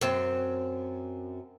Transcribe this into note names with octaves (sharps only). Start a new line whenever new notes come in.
F#2 C4